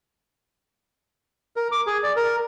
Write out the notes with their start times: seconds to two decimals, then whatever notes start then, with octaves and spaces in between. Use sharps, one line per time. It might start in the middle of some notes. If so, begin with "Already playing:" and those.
1.56 A#4
1.72 D6
1.87 G#4
2.03 D5
2.16 A#4